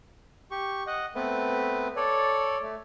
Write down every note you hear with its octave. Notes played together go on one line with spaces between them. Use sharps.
G4 C#6
D#5 F#5
A3 B3 C4 B4
A4 C#5 D5
A3